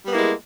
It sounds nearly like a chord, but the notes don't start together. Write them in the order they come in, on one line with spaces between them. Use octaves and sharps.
G3 B3 A#3 E4 G#3